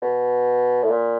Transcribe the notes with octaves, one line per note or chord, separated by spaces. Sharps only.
B2
A2
A#2